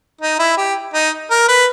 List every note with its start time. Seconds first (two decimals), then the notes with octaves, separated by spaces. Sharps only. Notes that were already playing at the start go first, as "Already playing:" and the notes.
0.21 D#4
0.39 E4
0.57 G4
0.94 D#4
1.31 A#4
1.48 B4